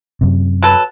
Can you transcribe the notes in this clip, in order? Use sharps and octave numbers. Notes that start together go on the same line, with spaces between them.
F#2 C3
F#3 A4 B4